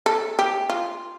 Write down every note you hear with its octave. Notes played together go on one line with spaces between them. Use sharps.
A4
G4
F4